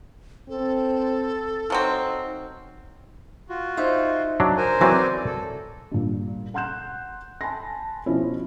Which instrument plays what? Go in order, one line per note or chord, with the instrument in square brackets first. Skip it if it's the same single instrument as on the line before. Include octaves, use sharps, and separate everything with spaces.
[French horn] C4 [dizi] A4
[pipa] F3 F#3 C4 [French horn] D#4
[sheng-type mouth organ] F4 F#4
[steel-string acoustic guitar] D#4 C5 E5
[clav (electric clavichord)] F#3 D4
[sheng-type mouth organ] A#4 C5 G#5
[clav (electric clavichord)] E3 F#3 C4 [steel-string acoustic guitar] D5
[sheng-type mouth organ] A4
[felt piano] G2 A#2
F#5 A#5 C6 F#6 G6 E7
G#5 A5 B5 C6 A#6
B2 F3 C#4 E4